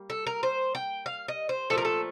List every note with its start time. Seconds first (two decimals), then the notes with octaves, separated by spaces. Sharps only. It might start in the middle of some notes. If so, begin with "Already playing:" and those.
Already playing: G3 A#3
0.10 A4
0.27 A#4
0.43 C5
0.75 G5
1.06 F5
1.28 D#5
1.49 C5
1.70 A#2 F3 A3 A4
1.78 A#4
1.85 A4